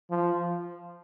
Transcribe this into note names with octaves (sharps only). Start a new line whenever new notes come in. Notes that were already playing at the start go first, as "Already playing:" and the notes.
F3